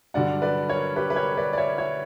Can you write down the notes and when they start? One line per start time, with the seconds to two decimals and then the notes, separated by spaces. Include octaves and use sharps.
0.14 G2 D3 F#3 D5 F#5
0.42 B4 D5
0.69 A#4 C#5
0.96 G4 B4
1.10 B4
1.16 A#4 C#5
1.37 B4 D5
1.53 D5
1.58 C#5 E5
1.78 C#5 E5